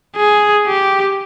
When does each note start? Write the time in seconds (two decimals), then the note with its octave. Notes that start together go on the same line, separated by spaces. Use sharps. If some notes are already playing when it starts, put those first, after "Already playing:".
0.17 G#4
0.67 G4